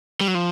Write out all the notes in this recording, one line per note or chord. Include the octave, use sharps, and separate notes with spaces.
G3
F#3
F3